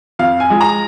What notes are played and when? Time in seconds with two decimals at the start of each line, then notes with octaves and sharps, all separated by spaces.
0.19 F2 F5
0.40 G#5
0.50 F3 G#3
0.61 A#5